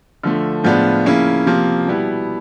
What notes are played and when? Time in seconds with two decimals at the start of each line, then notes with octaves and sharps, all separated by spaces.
0.24 D3 F3 A3
0.64 A2 F3 G#3 B3 D4
1.05 C#3 F3 A#3 C#4 E4
1.46 C3 F3 A#3
1.87 B2 G3 B3 E4